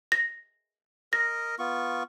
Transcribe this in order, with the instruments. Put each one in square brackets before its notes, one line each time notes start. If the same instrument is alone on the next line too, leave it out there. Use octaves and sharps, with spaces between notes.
[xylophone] A#6
[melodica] A#4 D#5 [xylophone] A#6
[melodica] B3 F4 C#6